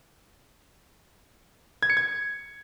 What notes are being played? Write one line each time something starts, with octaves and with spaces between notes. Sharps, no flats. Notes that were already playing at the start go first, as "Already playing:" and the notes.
G#6
C#7
G#6